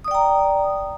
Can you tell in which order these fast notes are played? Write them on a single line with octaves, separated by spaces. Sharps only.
D#6 D5 G5 A#5